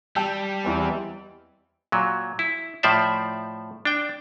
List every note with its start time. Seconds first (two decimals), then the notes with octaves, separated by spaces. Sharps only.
0.16 G3 G5 A5 E6
0.65 E2 E3 C4 E4 D#5 G#5
1.92 A#2 F#3
2.39 E4
2.83 A2 F3 C5 D5 E5
3.85 D4 G5